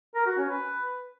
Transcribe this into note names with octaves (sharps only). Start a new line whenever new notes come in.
A#4
F#4
C#4
B4